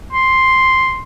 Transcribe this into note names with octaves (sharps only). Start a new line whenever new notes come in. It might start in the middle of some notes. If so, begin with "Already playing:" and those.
C6